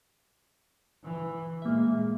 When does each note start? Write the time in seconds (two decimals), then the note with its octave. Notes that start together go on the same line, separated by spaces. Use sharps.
1.04 E3
1.62 A#2 G#3 A#3 E5